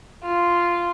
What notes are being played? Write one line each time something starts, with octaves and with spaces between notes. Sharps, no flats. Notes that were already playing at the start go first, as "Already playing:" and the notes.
F4